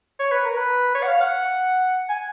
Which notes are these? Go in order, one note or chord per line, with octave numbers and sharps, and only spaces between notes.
C#5
B4
A#4
B4
C#5
F#5
F5
F#5
G#5